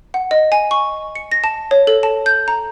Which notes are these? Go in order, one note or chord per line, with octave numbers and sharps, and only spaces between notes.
F#5
D#5
G#5
C#6
C#7
A#6
A5
C#5
A4
A5
G6
A#5